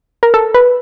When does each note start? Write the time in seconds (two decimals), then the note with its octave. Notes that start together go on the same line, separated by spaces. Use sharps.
0.23 A#4
0.34 A4
0.54 B4